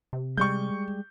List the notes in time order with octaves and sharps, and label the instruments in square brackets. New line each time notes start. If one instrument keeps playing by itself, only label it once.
[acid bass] C3
[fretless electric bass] G3 G#3 [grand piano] C#6 G6